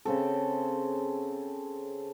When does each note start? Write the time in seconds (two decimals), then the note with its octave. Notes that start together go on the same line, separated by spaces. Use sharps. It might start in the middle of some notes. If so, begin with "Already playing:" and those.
0.05 C#3 C4 A4